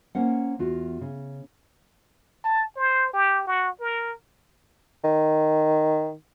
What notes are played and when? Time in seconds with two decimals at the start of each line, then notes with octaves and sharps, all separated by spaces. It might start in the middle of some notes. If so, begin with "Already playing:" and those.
0.15 A#3 C#4 A#4 C5 F#5
0.59 E2 F4 F#4
1.01 C#3
2.44 A5
2.77 C5
3.13 G4
3.47 F#4
3.80 A#4
5.04 D#3